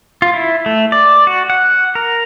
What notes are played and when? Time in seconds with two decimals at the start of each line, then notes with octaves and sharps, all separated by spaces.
0.22 F4
0.34 E4
0.66 A3
0.92 D5
1.27 F#4
1.50 F#5
1.95 A#4